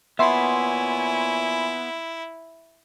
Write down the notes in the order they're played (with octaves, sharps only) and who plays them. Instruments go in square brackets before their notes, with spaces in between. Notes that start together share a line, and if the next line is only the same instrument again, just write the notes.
[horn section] A#2 C#5 G#5 [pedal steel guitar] B3 [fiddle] E4 [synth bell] E5 C6